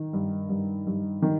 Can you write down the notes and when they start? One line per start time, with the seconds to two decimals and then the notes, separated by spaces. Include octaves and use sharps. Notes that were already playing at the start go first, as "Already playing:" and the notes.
Already playing: D#3
0.13 G2
0.49 G2
0.87 G2
1.22 D#3